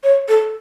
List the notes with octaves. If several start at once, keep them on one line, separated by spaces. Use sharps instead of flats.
C#5
A4